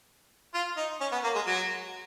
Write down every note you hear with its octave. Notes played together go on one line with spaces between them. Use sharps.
F4
D#4
C#4
B3
A#3
G#3
F#3